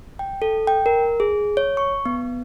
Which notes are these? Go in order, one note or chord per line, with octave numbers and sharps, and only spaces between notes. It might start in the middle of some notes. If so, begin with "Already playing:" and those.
G5
A4
G5
A#4
G#4
C#5
C#6
B3